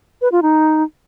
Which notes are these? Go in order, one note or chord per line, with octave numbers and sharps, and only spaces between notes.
B4
F4
D#4